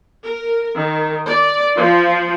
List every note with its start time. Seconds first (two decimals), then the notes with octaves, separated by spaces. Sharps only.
0.23 A#4
0.77 D#3
1.28 D5
1.77 F3